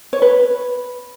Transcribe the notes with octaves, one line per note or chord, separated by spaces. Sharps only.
C#5
B4